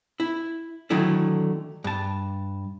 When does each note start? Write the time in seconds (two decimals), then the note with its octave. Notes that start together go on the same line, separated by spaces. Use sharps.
0.20 E4
0.90 D3 D#3 F#3 A3 E4 A4
1.84 G2 A5